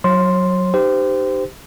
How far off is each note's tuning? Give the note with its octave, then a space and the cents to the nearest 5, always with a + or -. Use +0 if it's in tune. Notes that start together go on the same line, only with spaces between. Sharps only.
F#3 +0 C#5 -40 C6 +0
D#4 -30 G4 +0 C5 -25